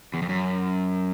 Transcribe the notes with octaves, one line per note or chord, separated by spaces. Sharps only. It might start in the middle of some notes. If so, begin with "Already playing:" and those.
E2
F2
F#2